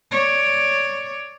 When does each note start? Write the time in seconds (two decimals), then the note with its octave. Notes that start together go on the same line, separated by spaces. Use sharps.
0.12 C#5 D5